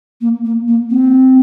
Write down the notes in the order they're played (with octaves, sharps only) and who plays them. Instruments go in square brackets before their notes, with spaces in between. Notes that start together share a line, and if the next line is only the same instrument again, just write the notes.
[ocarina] A#3
A#3
A#3
C4